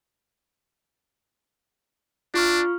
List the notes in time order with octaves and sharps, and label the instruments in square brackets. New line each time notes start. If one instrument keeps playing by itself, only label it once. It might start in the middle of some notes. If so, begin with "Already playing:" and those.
[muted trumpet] D4 [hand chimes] F4 C#6 F6